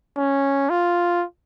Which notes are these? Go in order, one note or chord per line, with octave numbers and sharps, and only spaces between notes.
C#4
F4